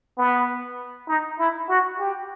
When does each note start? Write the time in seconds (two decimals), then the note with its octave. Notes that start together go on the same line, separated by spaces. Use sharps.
0.18 B3
1.08 D#4
1.39 E4
1.69 F#4
1.99 G4